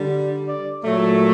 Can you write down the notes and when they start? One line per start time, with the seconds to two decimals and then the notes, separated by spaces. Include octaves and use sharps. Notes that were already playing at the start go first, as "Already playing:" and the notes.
Already playing: D3 G3
0.47 D5
0.83 A#2 F#3 A3